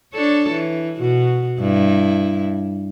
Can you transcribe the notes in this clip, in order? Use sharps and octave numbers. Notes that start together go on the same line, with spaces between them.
D4 A4 C#5
E3
B2 F#4
G2 E4